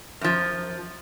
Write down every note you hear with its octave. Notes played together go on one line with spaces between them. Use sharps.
F#2 F3